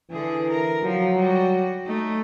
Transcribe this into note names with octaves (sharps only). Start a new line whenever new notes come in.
D3 E3 G#4
A#4
F3 F#3
G3 F#4
A3 D#4